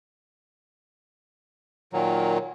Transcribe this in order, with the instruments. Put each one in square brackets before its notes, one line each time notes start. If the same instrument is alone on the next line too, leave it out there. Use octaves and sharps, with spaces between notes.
[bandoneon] A#2 D#3 F#3